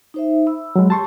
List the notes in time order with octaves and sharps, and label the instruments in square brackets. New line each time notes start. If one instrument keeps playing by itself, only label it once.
[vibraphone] D#4 C5 E5
B5 E6
[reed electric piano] F#3 G#3
[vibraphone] G4 [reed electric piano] A5 C6 C#6